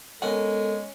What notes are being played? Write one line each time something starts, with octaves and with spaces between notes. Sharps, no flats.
G#3 B3 C#4 A4 A#4 F#5